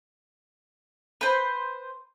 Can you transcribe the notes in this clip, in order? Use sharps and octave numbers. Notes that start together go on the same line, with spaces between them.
B4 C5